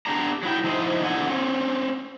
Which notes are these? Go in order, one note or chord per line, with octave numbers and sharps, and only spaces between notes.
B3 D4 G4 G#4 D5 A#5
F#3 E4 G5
F3 D#4 E4 C5 D#5 G#5
E2 A#2 D3 F#5 G#5
C4 C#4